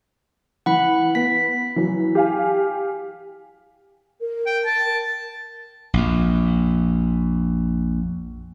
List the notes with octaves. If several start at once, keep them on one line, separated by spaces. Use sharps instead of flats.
E3 F#5 B5
B3 B6
E3 F#3
G4 F5 G#5
A#4
G5
A5
A#1 F2